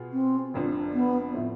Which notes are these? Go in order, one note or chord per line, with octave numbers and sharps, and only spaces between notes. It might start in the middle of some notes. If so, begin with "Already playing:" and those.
Already playing: B2 B3 F4 G#4
C4
F1 F2 D3 F3
B3
A2 F3 A3 C4